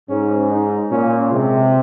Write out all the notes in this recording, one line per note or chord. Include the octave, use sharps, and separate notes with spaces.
G#2 C#4
D#4
A#2 C#4
C3 G#3